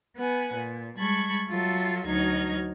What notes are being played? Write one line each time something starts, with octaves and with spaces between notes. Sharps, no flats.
B3 B4 F#5 G#5
A#2
G3 G#3 A5 B5 C#6 G#6
F#3 F4 A4 E5
D2 F#3 D#4 D#5 F6 G#6